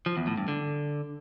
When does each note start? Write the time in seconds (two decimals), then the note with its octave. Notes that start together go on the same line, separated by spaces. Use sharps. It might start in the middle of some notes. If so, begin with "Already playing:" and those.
0.06 F3
0.17 E2
0.27 A2
0.38 G2
0.48 D3